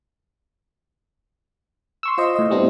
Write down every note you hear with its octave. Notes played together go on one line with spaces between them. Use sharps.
C6 C#6 E6
F4 C5 D#5
A2 D#5
G3 B3 C4 D4 E4 G4